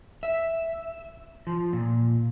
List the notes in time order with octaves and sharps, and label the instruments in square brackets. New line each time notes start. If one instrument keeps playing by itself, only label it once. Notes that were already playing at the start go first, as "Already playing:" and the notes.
[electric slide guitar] E5
F3
A#2